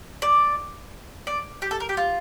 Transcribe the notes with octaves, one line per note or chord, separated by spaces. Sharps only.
D5
D5
G4
A4
A#4
G4
F4